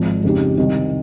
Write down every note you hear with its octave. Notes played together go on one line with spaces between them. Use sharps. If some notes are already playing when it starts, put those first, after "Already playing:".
Already playing: G#1 G#2 F3
F2 C#3 G#3 D#4 G4
C2 C3 D#3